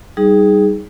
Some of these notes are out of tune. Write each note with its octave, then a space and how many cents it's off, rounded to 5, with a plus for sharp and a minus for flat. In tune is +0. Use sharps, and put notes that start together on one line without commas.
G3 +0 D#4 +5 G#4 +0